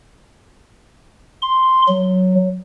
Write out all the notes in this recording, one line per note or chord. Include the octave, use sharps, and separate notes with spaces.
C6
F#3